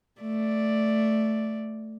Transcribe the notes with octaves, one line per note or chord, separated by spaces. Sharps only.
A3 D5